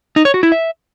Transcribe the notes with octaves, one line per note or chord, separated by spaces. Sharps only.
D#4
C#5
F#4
E4
E5